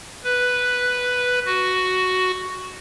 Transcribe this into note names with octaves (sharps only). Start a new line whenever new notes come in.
B4
F#4